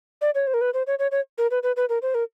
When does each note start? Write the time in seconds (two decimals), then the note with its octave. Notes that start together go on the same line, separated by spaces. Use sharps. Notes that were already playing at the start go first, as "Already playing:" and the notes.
0.21 D5
0.35 C#5
0.47 C5
0.54 A#4
0.61 B4
0.74 C5
0.87 C#5
0.99 C#5
1.11 C#5
1.38 A#4
1.51 B4
1.63 B4
1.76 B4
1.89 A#4
2.02 C5
2.14 A#4